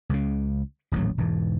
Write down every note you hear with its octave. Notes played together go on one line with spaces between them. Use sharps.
C#2 C#3
D#1 A1 A2 F#3
E1 G#2 E3